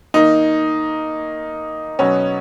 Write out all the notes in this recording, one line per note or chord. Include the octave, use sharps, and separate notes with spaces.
D#3 A#3 D#4
B2 F#3 B3 C#4